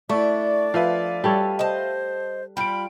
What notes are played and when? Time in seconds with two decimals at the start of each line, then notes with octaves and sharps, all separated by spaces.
0.09 A3 D4 E4 D5 C#6
0.74 F3 B4 E5 F5
1.24 G3 A4 C#5
1.59 C5 D#5 A5
2.57 G3 F4 G5 B5 D7